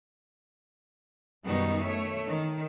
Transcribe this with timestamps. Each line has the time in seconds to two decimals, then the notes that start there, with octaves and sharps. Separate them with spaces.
1.46 F#2 B2 D#3 G3 B3 D#4
1.86 A3 C#5 E5
2.27 D#3